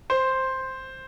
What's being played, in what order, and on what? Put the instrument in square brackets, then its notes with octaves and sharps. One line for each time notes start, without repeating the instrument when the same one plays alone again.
[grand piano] C5